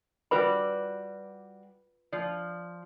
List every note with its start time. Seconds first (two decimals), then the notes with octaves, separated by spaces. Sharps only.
0.31 G3 F4 F#4 B4 D5 B5
2.13 F3 D5